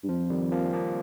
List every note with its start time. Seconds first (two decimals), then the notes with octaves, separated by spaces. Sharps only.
0.04 G2
0.09 F2 F3
0.30 D#3 G3
0.52 F3 A#3
0.66 C4
0.73 F3 A#3